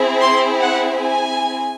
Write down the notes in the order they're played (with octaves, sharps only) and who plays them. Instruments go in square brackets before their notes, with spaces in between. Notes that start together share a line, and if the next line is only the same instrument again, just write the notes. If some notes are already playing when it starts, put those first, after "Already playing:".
Already playing: [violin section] C4 E4 G#4
C6
F#5
G#5